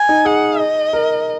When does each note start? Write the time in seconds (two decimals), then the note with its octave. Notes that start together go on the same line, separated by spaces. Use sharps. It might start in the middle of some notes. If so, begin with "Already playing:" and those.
Already playing: G#5
0.09 D#4
0.25 G#4 F#5
0.59 D#5
0.93 A#4